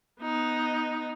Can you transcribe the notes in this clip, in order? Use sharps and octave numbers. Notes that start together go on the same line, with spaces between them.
B3 D#4